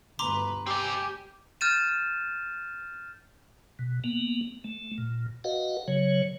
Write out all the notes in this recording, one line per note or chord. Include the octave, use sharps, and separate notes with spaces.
G1 D2 B4 A#5 C6 D6
C4 G4 D5 G#5
F6 G6 A6 D#7 E7
B2
A#3 B3
A3
A#2
F#4 B4 D#5 F5 F#5
C#3 F#3 C#5